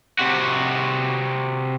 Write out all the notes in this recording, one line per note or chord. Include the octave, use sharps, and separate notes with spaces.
C3 F#4